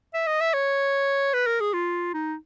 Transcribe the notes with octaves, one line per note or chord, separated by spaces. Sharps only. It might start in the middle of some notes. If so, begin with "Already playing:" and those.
E5
D#5
E5
C#5
B4
A#4
G#4
F4
D#4